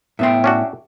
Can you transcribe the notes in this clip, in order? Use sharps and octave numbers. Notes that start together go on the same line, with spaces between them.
A2 B3 E5 G5 C6
C#4 D4 F#4